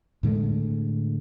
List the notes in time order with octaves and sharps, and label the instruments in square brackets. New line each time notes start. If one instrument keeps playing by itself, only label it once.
[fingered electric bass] A2 D3 G#3 A3